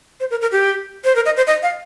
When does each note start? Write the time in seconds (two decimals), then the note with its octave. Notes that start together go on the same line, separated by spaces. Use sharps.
0.20 C5
0.31 A#4
0.42 A#4
0.52 G4
1.05 C5
1.16 A#4
1.26 D#5
1.37 C5
1.47 D#5
1.63 F5